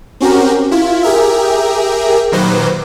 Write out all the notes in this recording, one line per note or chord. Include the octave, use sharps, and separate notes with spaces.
C4 C#4 F#4 G4 A#4
E4 F4
G4 G#4 A#4 E5
A#2 D#3 F#3 B4 C5 D6